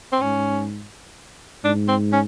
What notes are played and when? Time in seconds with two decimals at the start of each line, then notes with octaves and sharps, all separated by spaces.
0.12 C4
0.21 G#2 C#4
1.64 G#2 D4
1.88 C4
2.12 C#4